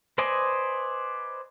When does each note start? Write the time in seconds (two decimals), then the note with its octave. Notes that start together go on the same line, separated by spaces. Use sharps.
0.18 B4 C5 D5 D#5 G#5